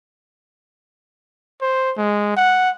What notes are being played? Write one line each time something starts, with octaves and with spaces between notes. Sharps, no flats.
C5
G#3
F#5